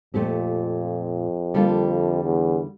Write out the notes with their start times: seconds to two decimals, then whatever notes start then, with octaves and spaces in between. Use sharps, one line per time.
0.14 F2 A#2 A3 C4 G4
1.54 D3 G3 A#3 F4 A4
2.23 E2